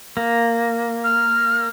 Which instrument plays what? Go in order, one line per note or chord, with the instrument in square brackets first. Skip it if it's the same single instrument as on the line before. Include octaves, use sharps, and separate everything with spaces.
[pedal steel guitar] A#3
[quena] F6